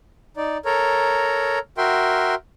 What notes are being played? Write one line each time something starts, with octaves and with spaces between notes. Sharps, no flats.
D#4 D5
A4 A#4 C#5 A#5
F#4 A#4 E5 G5 C6